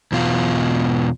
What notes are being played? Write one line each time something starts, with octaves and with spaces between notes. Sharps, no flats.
E2 B2 F4